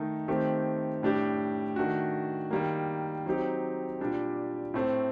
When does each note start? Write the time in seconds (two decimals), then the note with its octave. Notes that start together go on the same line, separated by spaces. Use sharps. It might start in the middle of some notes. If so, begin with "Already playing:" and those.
Already playing: D#3 A3 D#4
0.28 D#3 A3 C4 G4
1.03 A2 G3 D4 G4
1.76 D#3 A3 D4 F#4
2.51 D#3 G3 A#3
3.26 F#3 C4 D#4 G4
4.00 A#2 G3 D4 G4
4.74 A2 A3 C4